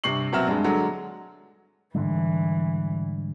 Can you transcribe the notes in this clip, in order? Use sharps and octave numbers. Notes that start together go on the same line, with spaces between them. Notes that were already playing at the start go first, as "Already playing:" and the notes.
G2 C3 C4 C#6 C7 F#7
B2 F#3 A#3 C4 E5 F6
G2 G#3
D3 F#3 G#3 A4
G#2 D3 E3 G3